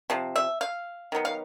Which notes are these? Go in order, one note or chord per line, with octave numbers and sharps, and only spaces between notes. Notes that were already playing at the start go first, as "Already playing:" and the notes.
C3 F3
E5
F5
D#3 F#3 B3
F5